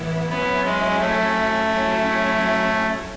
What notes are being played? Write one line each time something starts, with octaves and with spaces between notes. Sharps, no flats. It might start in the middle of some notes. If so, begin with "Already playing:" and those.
Already playing: A2 E3 B3 E4
F#3 B3 C#4 E4
G#3
A3
F#3 C#4 E4